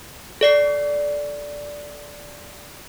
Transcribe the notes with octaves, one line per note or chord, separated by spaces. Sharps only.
A4 D5 C7